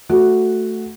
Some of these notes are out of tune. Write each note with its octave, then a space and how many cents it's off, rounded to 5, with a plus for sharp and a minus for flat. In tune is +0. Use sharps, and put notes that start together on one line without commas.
A3 +0 F#4 +0